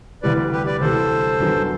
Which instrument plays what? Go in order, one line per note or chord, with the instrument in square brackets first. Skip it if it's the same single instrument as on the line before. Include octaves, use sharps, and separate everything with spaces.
[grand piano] D2 C3 E3 G3 [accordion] B4 D5
[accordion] G4 B4
B4 D5
[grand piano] D2 C3 E3 G3 [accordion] A4 C5
[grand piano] F#2 D3 F#3 B3